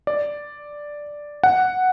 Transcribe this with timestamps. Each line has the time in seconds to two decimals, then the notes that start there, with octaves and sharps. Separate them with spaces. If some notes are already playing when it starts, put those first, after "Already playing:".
0.07 D5
1.43 F#5